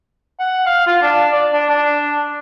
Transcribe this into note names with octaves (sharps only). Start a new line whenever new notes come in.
F#5
F5
F4
D4
D5
D4
D4